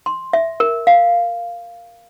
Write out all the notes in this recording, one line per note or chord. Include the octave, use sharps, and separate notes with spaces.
C6
E5
A#4
F5